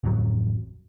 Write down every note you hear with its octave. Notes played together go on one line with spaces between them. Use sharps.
D1 A1 F2 F#3